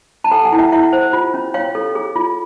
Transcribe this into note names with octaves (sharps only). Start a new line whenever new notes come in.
A5
A4 F#5 G#5
F#5 G#5
E4 G5
E5 F#5
E4 E5 F#5
C5
F4
C#4
C#5 F5 G5
A4
G#4
F4